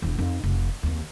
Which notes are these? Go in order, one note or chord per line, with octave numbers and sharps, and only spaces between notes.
E1 E2
F2 D#4
F1
D#2 C4